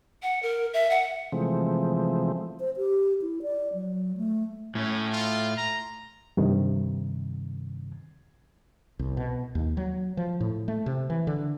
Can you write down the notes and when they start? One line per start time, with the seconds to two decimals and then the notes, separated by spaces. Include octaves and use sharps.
0.23 F#5
0.43 A#4
0.74 E5
0.90 F#5
1.32 C3 E3 F3 G#3 A3 C4
2.60 C5
2.77 G4
3.22 E4
3.42 D5
3.74 F#3
4.17 A3
4.75 A2 C#4
5.12 F4
5.57 A#5
6.37 G2 C3 D#3
8.99 C2
9.17 B2
9.55 D#2
9.77 F#3
10.17 F3
10.40 A2
10.68 A3
10.86 C3
11.10 E3
11.27 D3